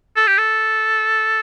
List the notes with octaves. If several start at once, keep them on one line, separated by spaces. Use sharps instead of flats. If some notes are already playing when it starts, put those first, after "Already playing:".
A4
G4
A4